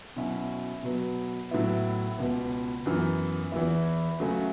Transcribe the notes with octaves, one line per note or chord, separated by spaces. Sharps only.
B2 F#3 C#4 E4
B2 F#3 B3
A2 F#3 B3 E4
C#2 B2 B3
F#2 E3 B3
E2 E3 B3 E4
C#3 F#3 A3 C#4